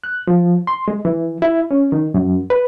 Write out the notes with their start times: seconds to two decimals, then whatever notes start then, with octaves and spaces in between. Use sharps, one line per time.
0.04 F#6
0.27 F3
0.67 C6
0.88 G#3
1.05 E3
1.42 E4
1.71 C#4
1.92 D#3
2.14 F#2
2.50 B4